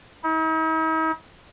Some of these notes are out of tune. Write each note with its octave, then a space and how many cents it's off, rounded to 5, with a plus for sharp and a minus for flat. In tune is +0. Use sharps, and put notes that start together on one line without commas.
D#4 +45